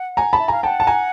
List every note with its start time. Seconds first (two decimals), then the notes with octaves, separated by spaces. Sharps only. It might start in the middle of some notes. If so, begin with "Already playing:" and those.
Already playing: F#5
0.17 G#5 A#5
0.33 A5 B5
0.39 E5
0.48 F5 G#5 A#5
0.63 F#5 G5 A5
0.80 A5
0.87 G#5 A#5